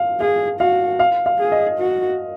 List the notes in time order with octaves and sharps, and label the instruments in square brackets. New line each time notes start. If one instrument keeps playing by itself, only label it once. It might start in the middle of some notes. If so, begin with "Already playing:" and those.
Already playing: [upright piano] F5
[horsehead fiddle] G#4 [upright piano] F5
[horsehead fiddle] F#4 [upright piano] F5
[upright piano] F5
F5
[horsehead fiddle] G#4
[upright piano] D#5
[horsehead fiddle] F#4